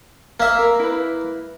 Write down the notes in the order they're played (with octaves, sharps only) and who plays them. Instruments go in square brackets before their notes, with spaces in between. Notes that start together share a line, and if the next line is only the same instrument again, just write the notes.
[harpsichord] A#3 E5
[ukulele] A#4
E4 B4